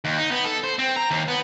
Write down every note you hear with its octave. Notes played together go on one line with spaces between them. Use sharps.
D#2
D#4
B3
A4
C5
C4
A#5
D#2
B3